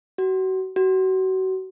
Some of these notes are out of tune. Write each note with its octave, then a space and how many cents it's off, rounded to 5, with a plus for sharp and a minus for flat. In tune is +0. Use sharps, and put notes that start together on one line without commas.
F#4 +30
F#4 +30